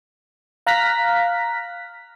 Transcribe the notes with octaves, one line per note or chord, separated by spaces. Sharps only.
F5 A#5 F6 F#6 A#6 B6